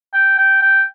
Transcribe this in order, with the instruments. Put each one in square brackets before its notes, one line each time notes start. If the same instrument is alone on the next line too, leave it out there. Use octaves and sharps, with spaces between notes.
[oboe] G5
G5
G5